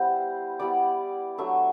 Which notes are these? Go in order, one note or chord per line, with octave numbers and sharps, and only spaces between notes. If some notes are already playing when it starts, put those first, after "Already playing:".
Already playing: G3 B3 E4 C5
G3 B3 E4 D5
F#3 A3 D4 E5